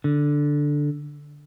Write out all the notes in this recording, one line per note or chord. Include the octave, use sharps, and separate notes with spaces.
D3